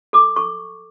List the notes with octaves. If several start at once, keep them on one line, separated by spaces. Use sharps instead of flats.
A4 D6
A4 C#6